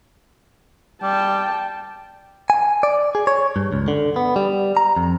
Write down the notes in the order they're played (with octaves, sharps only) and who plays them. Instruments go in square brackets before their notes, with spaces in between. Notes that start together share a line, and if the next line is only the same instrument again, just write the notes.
[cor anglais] G3 [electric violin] G5 A5
[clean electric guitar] G#5
D5
G#4
C#5
G2
C#2
D3
B3
G3
A#5
F2